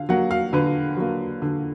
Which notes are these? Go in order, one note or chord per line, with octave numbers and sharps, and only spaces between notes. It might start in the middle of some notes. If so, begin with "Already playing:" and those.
Already playing: D3 F5
F#3 A#3 F#5
F5
D3 B4
F#3 A#3
D3